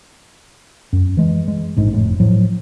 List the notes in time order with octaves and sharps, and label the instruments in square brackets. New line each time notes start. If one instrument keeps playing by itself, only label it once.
[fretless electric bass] F#2
E3 G#3
G#3
A#1 G#2 G#3
F1 A2
A2 F3 F#3